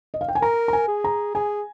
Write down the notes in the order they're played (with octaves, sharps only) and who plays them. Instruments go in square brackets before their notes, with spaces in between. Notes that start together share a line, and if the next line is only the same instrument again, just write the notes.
[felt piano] D#5
F5
G5
G#5
[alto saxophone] A#4 [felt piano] A#5
[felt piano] A#5
G#5
[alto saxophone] G#4
[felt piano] A#5
[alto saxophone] G#4 [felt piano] G#5